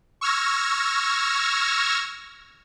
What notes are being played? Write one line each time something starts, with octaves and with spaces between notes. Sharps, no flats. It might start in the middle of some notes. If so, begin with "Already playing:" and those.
C#6 E6 F6 G#6 A#6